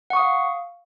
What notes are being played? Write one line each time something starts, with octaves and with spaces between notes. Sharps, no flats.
F5 F#5 C#6 D#6